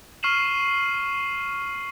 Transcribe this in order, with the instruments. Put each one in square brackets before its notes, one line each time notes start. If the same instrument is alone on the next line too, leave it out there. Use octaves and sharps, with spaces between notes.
[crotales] C#6 F6 C7 D#7 E7 F#7